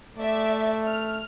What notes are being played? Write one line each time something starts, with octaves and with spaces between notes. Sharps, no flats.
A3 D5 E5
F6